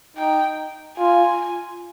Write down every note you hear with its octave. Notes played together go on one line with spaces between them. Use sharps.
D#4 G5
F4 G#5